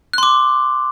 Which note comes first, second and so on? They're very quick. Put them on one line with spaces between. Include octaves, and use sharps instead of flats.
F#6 C6 D6